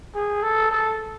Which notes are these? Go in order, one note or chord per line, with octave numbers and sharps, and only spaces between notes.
G#4
A4
A4